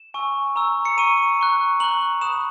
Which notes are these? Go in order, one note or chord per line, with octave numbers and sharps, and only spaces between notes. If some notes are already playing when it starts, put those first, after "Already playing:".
Already playing: E7
G#5 C#6 E6
A#5 C#6 E6
C#7
A#5 C#6 E6 D#7
A#5 C#6 F#6
A#5 C#6 F#6 F#7
B5 D#6 F#6 E7